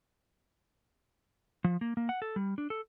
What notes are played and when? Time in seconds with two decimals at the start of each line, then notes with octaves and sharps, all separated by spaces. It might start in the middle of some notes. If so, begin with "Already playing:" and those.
1.64 F3
1.81 A#3
1.97 A#3
2.09 F#5
2.22 A4
2.36 G3
2.58 D4
2.70 A4